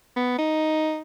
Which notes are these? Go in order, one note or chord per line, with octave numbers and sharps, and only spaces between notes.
B3
D#4